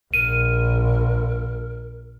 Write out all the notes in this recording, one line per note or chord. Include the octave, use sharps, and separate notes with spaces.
A#1 A#4 D#7